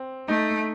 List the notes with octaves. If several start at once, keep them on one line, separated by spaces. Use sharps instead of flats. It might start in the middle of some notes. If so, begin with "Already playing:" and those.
Already playing: C4
A3 D#4